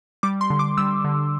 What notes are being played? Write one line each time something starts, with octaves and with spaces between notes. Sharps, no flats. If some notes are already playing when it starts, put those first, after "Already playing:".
G3 D6
C6
D3
D6
G3 E6
D3